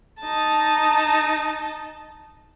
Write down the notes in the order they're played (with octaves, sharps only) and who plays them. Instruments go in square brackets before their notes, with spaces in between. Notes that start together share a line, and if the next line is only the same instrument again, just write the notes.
[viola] D#4 A5